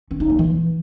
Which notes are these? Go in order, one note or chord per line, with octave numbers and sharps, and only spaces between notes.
C#4
D#4
A#3
E3